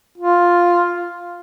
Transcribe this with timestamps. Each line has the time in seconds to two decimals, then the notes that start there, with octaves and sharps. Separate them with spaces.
0.18 F4